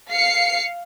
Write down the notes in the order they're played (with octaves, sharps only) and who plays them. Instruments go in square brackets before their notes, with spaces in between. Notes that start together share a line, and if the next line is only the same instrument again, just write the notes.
[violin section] F5 C7 C#7